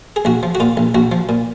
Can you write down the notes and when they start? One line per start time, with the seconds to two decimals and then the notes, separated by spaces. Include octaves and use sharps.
0.16 G#4
0.25 A#1 F#4
0.43 F3
0.55 F#4
0.60 A#2 F4
0.77 A#1
0.95 A#1 F#4
1.12 F3
1.29 A#2